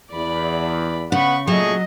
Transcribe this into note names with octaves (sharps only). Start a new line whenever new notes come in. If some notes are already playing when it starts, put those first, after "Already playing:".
E2 D5 B5
C#3 B3 F#5 B5 C#6
A#2 C#3 F#3 A3 G#4 D#5 C#6